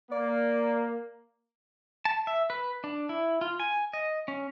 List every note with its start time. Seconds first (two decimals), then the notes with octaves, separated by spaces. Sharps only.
0.12 A#3 D5
2.05 A5
2.27 E5
2.50 B4
2.84 D4
3.09 E4
3.41 F4
3.60 G#5
3.93 D#5
4.28 C#4